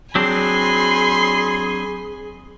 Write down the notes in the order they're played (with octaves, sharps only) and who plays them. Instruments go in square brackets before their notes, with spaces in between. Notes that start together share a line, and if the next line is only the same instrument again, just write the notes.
[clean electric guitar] F#3 C4 D4 [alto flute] G#4 [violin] G#5 B5 [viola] C6